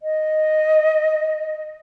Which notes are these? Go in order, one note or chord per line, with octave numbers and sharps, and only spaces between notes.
D#5